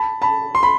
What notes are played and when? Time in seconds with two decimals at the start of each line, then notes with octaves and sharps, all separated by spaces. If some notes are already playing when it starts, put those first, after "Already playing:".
Already playing: A5 B5
0.22 A5 B5
0.55 C6
0.63 B5